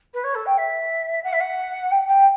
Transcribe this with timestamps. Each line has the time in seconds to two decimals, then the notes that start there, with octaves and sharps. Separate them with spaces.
0.13 B4
0.23 C#5
0.34 A4
0.46 G5
0.57 E5
1.23 F#5
1.33 E5
1.40 F#5
1.91 G5
2.08 G5